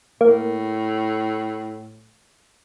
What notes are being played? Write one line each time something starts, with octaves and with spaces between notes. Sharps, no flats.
A2 A#3